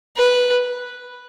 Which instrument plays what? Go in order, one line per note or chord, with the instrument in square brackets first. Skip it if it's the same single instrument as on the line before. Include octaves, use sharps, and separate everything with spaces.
[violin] B4